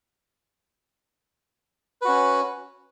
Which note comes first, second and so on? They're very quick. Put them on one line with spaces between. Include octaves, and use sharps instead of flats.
B4 F#4 C#4